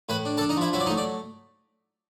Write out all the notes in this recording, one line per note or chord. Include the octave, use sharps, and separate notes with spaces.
A2 B4 B5
D4
A4 A5
D4
D#4 D#5
F3 E4 E5
F#3 E4 E5
D5
D#4 D#5
A3
D5